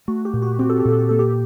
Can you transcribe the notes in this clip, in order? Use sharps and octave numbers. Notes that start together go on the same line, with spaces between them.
A3 F#4
G4
A#2
F#4
C4 G4
A4
G4
A#2 A4
G4
A#3 A4
G4